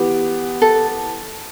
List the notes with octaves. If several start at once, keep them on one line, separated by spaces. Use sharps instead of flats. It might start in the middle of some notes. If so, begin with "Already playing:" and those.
Already playing: E3 B3 G4
A4